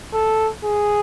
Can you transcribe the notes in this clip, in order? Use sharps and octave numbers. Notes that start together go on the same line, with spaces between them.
A4
G#4